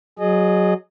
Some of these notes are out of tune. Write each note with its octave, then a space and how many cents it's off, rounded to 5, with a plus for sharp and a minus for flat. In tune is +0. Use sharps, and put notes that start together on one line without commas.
F#3 +0 G#4 +10 D#5 -25